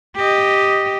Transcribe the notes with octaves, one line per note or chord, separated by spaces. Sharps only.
G4 D#5